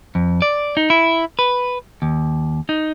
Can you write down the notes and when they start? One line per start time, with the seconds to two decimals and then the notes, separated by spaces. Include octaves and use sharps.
0.15 F2
0.42 D5
0.77 D#4
0.90 E4
1.39 B4
2.02 D#2
2.69 D#4